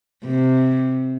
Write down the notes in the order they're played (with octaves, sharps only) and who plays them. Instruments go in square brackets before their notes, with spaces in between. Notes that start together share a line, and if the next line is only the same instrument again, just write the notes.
[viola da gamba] C3